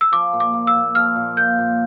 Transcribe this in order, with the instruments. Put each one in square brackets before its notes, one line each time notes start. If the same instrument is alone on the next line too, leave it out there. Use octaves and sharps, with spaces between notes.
[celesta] E6
[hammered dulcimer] F3 [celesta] D6
[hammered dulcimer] A#2
[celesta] D6
[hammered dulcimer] A#3
[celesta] E6
[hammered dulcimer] A#2
[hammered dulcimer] F3 [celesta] F6
[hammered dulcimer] A#2
[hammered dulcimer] A#3 [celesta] G6
[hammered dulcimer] A#2